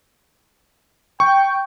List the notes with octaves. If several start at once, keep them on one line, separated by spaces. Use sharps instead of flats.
G5 C#6